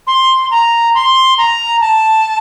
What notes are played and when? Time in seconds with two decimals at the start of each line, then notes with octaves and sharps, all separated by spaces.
0.07 C6
0.51 A#5
0.95 C6
1.38 A#5
1.81 A5